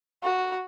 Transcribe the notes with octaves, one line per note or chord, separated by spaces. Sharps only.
F#4